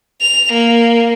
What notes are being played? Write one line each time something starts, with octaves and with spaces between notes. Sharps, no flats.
F7
A#3